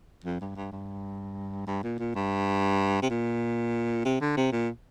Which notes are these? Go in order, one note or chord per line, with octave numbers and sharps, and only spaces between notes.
F2
G2
G2
G2
G2
A#2
A#2
G2
C3
A#2
C3
D3
C3
A#2